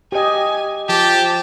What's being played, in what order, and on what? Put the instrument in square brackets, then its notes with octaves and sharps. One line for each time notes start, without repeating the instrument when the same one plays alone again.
[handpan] G4 D#5 [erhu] G#5
[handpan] F3 [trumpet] G4 [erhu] A5